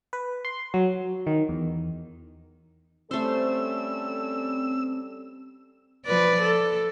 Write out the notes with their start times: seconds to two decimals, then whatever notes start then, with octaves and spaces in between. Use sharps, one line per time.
0.13 B4
0.45 C6
0.74 F#3
1.27 D#3
1.49 E2
3.11 G3 A3 C4 C#4 A4 C5 E6
6.05 F3 B4 D5
6.42 A4